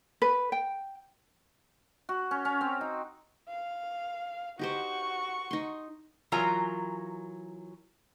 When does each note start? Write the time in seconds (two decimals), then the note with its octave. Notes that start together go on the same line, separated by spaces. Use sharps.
0.22 B4
0.52 G5
2.09 F#4
2.31 C#4
2.45 C#4
2.61 C4
2.81 D#4
3.48 F5
4.59 D#4 F#4 G4 C5 C#6
5.51 D#4 C6
6.32 E3 F#3 F4 A#4 G#5 A#5